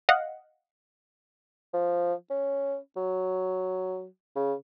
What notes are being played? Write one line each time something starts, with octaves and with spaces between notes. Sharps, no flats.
D#5 F5 F#5
F3
C#4
F#3
C#3